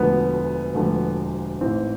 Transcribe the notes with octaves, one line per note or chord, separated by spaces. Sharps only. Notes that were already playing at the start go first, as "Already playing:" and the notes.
Already playing: E1 D2 D3 F3 B3
E1 D2 D3 F3
A1 G#2 E3 C4